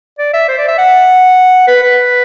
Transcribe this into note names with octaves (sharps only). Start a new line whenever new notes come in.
D5
E5
C5
D5
E5
F#5
B4
B4